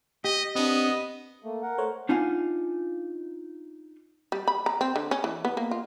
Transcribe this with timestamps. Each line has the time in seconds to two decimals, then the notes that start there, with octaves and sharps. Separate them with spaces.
0.24 G4 D#5
0.55 B3 C4 D4 D#5
1.44 A3 A#3
1.63 A#4 F#5
1.78 A3 C5 C#5
2.09 D4 D#4 F4 F5 F#5 G#5
4.32 G3
4.48 B5
4.66 A#5
4.81 C4
4.96 D3
5.11 C#4
5.24 E3
5.45 B3
5.57 A#3
5.71 F4